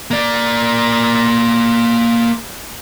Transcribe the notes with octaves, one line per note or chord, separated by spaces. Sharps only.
A#3 D5